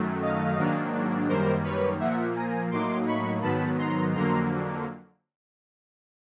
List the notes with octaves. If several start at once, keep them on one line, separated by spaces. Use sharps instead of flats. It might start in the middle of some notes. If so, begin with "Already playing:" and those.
Already playing: F#2 D#3 F#3 A3
D#5 F5
G#2 D#3 F#3 A#3 D4
F#2 D#3 G3 A#3 A#4 C5
B4 C#5
A#2 F3 A#3 E5 F#5
G#5 A#5
A2 F#3 A#3 D#4 C6 D6
B5 C#6
G#2 D#3 F#3 B3 A5 B5
A#5 C6
F2 D3 F#3 A#3 A#5 C6